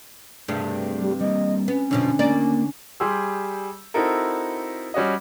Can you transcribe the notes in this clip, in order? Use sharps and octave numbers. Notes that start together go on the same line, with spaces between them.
G2 C3 A3 D4 G#4
G3
G3 A#3 D#5
B3 C#4
F#2 B2 D3 F3 D4
D#2 A#3 D5
G3 G4 G#4 C6 E6
C4 D#4 E4 F#4 A4 A#4
G3 C#4 F#4 D#5